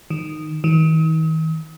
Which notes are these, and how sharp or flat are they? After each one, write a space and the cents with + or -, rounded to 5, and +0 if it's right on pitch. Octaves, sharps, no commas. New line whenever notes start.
D#3 -10
D#3 +40